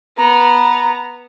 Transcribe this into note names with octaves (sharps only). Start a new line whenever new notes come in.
B3 A#5